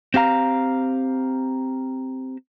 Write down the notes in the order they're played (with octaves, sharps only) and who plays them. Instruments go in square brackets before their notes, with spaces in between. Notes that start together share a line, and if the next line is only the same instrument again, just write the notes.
[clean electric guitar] C4 G4 F5 A#5